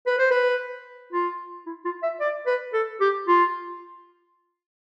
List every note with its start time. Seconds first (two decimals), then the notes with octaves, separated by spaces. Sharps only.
0.07 B4
0.18 C5
0.31 B4
1.12 F4
1.66 E4
1.85 F4
2.03 E5
2.20 D5
2.46 B4
2.73 A4
3.00 G4
3.27 F4